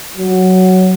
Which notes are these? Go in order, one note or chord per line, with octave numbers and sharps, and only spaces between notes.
F#3